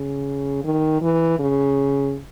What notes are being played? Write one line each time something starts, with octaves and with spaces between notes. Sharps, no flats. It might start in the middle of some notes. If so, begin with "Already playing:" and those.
Already playing: C#3
D#3
E3
C#3